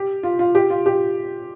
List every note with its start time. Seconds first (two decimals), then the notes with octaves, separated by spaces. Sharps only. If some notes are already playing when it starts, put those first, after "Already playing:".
Already playing: G4
0.23 F4
0.39 F4
0.55 G4
0.70 F4
0.86 G4